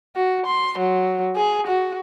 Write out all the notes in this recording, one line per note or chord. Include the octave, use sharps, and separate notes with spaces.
F#4
C6
F#3
G#4
F#4